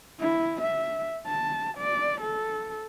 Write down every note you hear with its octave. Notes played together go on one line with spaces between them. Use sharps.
E4
E5
A5
D5
A4